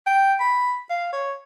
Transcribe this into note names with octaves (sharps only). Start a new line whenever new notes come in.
G5
B5
F5
C#5